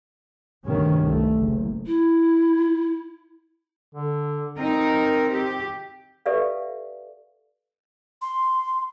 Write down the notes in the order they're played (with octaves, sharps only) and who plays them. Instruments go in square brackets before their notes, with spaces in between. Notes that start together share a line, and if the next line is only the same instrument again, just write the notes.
[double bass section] D2 G2 C3 D#3 C#4
C2 A3
F#1
[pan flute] E4
[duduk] D3
[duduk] C4 [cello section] D#4 A#4
[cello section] G4
[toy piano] G4 A4 B4 D5 E5 F5
[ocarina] C6